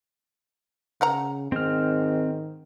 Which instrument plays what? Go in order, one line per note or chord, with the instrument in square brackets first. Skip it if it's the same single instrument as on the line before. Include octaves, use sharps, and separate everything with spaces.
[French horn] C#3 [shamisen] A#4 F#5 A#5
[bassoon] G#2 [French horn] D#3 [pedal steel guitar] C4 F6